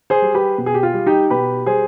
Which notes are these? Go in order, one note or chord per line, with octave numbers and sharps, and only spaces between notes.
G#4 C5
G3
G4 B4
B2
G#4
G4
F4
G3
D#4 G4
B2 G4 B4
G3 G#4 C5